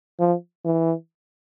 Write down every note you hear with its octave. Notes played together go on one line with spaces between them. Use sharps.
F3
E3